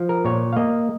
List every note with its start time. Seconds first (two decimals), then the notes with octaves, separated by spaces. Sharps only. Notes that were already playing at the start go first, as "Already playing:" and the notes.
Already playing: F3
0.09 A#4
0.25 A#2 C#5
0.53 F5
0.56 A#3 D#5